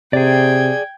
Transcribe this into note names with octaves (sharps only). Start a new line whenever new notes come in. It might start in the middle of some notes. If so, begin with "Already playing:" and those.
C3 G#4 D5 G5 G#6